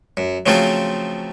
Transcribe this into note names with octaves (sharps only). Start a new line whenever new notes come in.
F#2
C#3 F3 F#3 A3 C4 F4